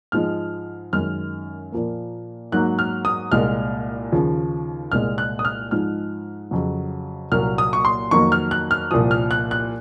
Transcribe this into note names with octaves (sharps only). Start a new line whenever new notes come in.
G#2 F3 G#3 F6
F#2 D#3 G#3 F6
A#2 F3 A#3
G#2 F#3 A#3 F#6
F6
D#6
C2 A#2 G#3 F6
D#2 C#3 F3
C2 A#2 G#3 F6
F#6
D#6
F6
G#2 F3 G#3 F6
F2 C#3 F#3
C2 A#2 F#3 A#3 F6
D#6
C#6
C6
F2 D#3 F#3 A#3 C#6
F6
F#6
F6
C2 A#2 F3 D#6
F6
F#6
F#6